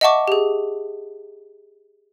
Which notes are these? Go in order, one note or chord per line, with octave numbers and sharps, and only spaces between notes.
D#5 E5 F#5 A5 C#6 D6
G4 G#4